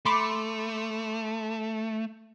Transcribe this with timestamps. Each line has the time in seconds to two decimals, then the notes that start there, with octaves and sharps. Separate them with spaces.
0.05 A3 B5 C6 D6